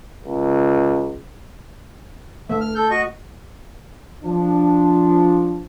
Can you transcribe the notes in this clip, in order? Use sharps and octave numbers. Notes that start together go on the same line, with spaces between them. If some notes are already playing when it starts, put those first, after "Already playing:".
C#2
A3 E5
F6
A4 G6
F#4 D#5 C#6
F3 D4